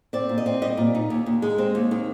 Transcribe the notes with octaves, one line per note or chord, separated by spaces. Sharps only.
C4 D5
A#2
D#5
C4
G3 D#5
A#2
D#4
D#2
D#2
G#3
C4
D#2
D#3